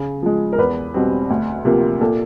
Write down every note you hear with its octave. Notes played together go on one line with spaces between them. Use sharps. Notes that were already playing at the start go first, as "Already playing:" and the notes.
Already playing: C#3
F3 G#3
A#4
E2 B4
B2 G3 C4
D2
C3 F3 A#3
A#2 A4